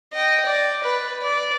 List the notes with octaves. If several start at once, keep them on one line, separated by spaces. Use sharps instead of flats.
D#5 G5
D5
B4
D5